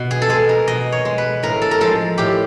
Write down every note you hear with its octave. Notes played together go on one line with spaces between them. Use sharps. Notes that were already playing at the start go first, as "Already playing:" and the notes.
Already playing: B2
G#4
A4
G#3 G#4
A#4
B2 D#5
C#5
G#3
B4
A2 A#4
A4
A#4
F3 G#3 A4
A2 G4